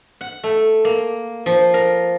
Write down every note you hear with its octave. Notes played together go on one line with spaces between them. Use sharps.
F#5
A3
A#3
F3
A#4